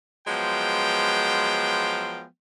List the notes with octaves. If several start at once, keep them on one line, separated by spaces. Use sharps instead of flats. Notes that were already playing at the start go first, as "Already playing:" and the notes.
F3 F#3 G#3 B3 F5 G5